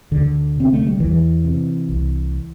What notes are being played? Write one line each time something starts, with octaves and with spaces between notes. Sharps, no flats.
D2 D3
C3 C4
A3
G3
E2 E3
C3
C2